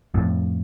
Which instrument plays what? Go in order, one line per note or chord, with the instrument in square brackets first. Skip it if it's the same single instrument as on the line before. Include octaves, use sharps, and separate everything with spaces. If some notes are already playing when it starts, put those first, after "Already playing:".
[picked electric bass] F2 A2